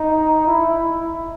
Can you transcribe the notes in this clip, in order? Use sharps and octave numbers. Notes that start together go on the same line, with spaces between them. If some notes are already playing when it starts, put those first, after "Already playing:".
Already playing: D#4
E4